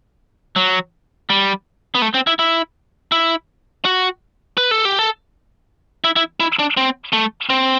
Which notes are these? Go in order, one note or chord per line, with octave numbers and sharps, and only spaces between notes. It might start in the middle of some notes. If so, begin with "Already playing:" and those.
F#3
G3
B3
A3
C4
E4
E4
E4
F#4
B4
A4
G4
A4
E4
E4
E4
D4
C4
A3
C4